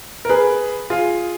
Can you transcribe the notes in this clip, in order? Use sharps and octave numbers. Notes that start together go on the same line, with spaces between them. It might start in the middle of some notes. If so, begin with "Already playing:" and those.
A#4
G#4 B4
F4 G#4